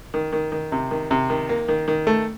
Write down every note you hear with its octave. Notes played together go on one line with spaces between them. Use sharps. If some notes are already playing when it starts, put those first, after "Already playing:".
D#3
D#3
D#3
C3
D#3
C3
D#3
A#3
D#3
D#3
A3